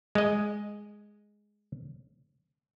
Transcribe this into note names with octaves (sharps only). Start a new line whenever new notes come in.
G#3 D#5